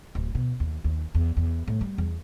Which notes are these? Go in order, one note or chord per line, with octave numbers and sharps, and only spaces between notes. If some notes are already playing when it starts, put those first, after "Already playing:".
D1
B2
D#2
D#2
E2
E2
A2
G3
E2